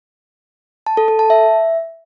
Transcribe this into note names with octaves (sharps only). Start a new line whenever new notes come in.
A5
A4
A4
A5
E5